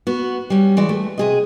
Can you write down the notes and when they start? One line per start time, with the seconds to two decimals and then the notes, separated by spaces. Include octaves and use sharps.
0.07 B3 F#4
0.50 G3 C#4
0.77 E3 G#3 F#4 D5
0.89 A3
1.18 C3 G#4 D#5